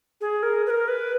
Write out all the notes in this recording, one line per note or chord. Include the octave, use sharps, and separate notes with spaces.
G#4
A#4
B4
A#4
B4